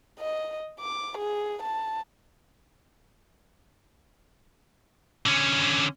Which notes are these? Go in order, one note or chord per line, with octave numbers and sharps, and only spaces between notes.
D#5
D6
G#4
A5
D3 C#4